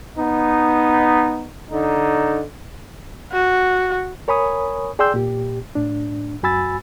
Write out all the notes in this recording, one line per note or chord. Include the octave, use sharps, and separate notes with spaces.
B3 D#4
D3 D#4
F#4
A#4 C#5 G#5 B5 C#6 D#6
G#4 D5 G5 C6 E6 G6
A#2 G4
A2 D4
F#2 F#4 G#5 B5 E6 A6